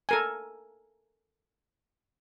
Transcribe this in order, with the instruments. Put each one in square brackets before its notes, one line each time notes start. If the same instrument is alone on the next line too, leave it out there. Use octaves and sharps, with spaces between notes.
[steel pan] A4 A#4 G#5